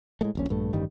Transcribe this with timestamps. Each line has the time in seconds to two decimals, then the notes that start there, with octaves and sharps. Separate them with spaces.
0.21 A2 G#3 A3
0.35 D#1 A#1 C#4
0.49 A#1 G2 A3
0.73 A1 G2 D#3 G3